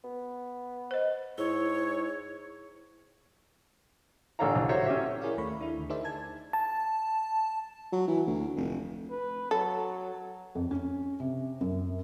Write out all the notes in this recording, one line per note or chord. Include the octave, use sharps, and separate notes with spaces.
B3
C5 D#5
G#2 E4 C#5
A1 D3 A4 C#5 F5 A#5
C2
F#4 C5 C#5 E5
C#4 G4 E5
E4 G#4 A#4 C#5 D5 F5
D#2 A3 B5 C#6
D4 E4
D#2 D3
D#4 G#4 A#4 C5 D5 E5
G#5 A5 G#6
A5
F#3
E3
D2
F1
B4
F#3 A4
F2
C#4
C3
F#2